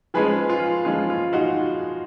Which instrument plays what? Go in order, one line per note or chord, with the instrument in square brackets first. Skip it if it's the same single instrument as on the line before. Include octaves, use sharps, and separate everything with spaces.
[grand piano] F3 G#3 C#4 G#4 B4
F4
F3 G#3 C#4 F4
F4
D#4 F#4